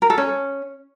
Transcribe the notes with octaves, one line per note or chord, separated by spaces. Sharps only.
A#4
A4
C#4